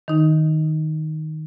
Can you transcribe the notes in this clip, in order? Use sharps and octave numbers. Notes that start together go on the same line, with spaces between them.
D#3 D#4